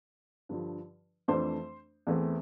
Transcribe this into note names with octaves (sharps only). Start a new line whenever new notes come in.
G2 D3 F3
F2 E3 A3 D4 C5
E2 E3 A3 C4